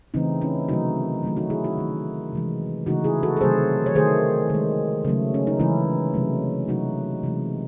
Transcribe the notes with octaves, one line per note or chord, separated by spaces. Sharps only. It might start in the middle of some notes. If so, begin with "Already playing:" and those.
C#3 E3 A3 C4 D#4
C#4 E4
C3 D#3 F#3 A3 D#4 F#4
D#3 F#3 A3
D#4 F#4
E4 G#4
D#4 F#4
D#3 A3
C3 E3 G#3
C#3 E3 A3 D#4 F#4
E4 G#4
F#4 A4
A4
C3 D#3 F#3 A3 G#4 C5
C#5
D#3 A3 G#4 C5
D#3 G#3
C#3 F#3 A3
C#4
D#4
C#3 E3 G#3 C#4 E4
C3 F#3 A3
C3 F#3 A3 D#4 F#4
C3 E3 G#3